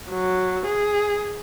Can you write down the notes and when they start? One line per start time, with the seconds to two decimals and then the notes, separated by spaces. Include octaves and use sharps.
0.11 F#3
0.66 G#4